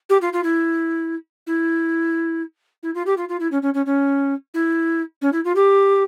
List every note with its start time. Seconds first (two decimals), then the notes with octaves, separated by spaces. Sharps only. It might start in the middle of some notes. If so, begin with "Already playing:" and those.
0.09 G4
0.21 F4
0.33 F4
0.43 E4
1.47 E4
2.83 E4
2.94 F4
3.06 G4
3.17 F4
3.28 F4
3.40 E4
3.51 C#4
3.62 C#4
3.74 C#4
3.86 C#4
4.54 E4
5.21 C#4
5.32 E4
5.44 F4
5.55 G4